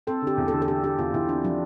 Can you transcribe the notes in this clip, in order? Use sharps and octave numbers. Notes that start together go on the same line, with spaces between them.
C4 A4
D3
G4
E2
D3 A4
A4
D3 G4
D3 G4
E2 F4
E2 E4
C4 D4
F3 D4